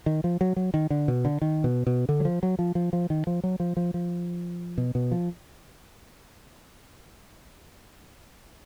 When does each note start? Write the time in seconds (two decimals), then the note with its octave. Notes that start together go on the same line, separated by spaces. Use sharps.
0.06 D#3
0.24 F3
0.41 F#3
0.56 F#3
0.74 D#3
0.90 D3
1.08 B2
1.25 D3
1.42 D#3
1.64 B2
1.87 B2
2.09 D3
2.20 F#3
2.25 F3
2.43 F#3
2.59 F3
2.75 F3
2.93 F3
3.10 D#3
3.27 F3
3.44 F#3
3.60 F3
3.77 F3
3.94 F3
4.78 B2
4.95 B2
5.11 F3